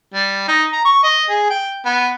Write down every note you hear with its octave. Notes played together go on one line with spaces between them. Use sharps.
G3
D#4
A#5
C#6
D#5
G#4
G5
B3